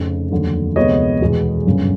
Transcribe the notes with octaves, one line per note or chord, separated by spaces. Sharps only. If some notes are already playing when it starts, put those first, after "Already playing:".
Already playing: F1 F2 C#3
F1 D#2 D3 F#3
D2 C3 F3 G#3 B3 C#5 D#5
E2 B2 G#3 B3
G1 F#2 C#3